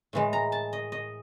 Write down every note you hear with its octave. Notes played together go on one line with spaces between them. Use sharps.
A2 E3 G#3
A#5
A5
D#5
D#5